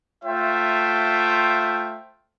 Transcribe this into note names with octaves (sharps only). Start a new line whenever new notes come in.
A3 F4 C5 E5 G5